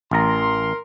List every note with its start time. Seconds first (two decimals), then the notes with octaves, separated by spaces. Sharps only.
0.11 A1 A#4 A#5 C6